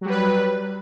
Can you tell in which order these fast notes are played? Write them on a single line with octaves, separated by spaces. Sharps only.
F#3 G3 B4